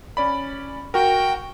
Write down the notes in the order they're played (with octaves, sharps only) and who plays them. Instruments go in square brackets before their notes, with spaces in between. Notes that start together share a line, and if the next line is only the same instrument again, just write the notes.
[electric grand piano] C#4 D5 B5
[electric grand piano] F#4 A#4 [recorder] G5